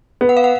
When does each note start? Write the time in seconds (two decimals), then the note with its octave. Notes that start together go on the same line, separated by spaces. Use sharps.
0.21 B3
0.29 F#5
0.37 F5
0.44 F#5